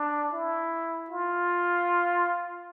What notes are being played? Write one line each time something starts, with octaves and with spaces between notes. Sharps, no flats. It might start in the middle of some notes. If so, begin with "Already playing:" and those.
Already playing: D4
E4
F4